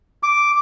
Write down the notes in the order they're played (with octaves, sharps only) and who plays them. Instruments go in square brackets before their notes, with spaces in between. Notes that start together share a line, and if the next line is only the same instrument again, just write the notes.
[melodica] D6